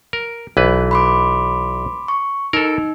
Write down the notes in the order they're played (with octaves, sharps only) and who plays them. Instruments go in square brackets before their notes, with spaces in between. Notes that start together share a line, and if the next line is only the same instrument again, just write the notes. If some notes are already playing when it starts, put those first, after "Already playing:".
[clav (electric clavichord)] A#4
B1 E3 B4
[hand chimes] B5 C6 D6
C#6
[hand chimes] D#4 [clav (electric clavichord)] A4 A#4